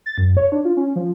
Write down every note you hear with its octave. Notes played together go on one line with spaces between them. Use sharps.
A6
F#2
C#5
D4
F4
C#4
F3